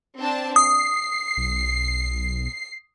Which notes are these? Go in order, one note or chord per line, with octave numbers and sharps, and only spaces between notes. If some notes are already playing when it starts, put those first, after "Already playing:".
C4 D4 A5
D#6 C7
B1